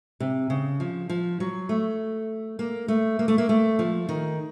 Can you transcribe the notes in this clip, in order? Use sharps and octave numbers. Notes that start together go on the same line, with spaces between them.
C3
C#3
F3
F3
F#3
A3
A#3
A3
A#3
A3
A#3
A3
F3
D#3